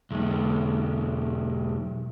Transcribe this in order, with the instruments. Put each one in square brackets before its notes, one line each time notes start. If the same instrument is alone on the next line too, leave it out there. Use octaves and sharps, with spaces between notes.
[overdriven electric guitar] B1 E2